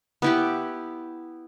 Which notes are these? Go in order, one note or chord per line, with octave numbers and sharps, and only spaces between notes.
B3 E4 G4